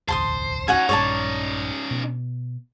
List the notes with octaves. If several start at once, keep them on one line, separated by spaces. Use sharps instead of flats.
E1 A1 D2 C5 A5 C6 D#6
C#4 D#4 F#4 F#5 G#5
A#1 G2 C#5 D5 A5
B2